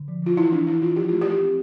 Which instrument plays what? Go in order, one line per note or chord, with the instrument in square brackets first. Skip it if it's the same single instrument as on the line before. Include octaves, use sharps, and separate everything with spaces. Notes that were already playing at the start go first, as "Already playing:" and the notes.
Already playing: [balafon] D3
F3
F3 F4
E3 E4
E3 D4
E3 E4
E3 F4
F3 G4
A3 F4
A3 G4
C4